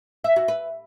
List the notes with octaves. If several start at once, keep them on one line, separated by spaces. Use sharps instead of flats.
E5
F#4
B4